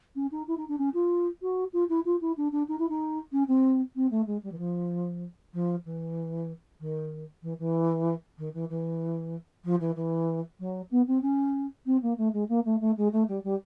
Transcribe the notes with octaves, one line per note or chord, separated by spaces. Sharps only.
C#4
D#4
E4
D#4
D4
C#4
F4
F#4
F4
E4
F4
E4
D4
D4
D#4
E4
D#4
C#4
C4
C4
A3
G#3
G3
E3
F3
F3
E3
D#3
E3
E3
D#3
E3
E3
F3
E3
E3
F#3
B3
C4
C#4
C4
A#3
A3
G#3
A#3
A3
A3
G#3
A3
G3
G3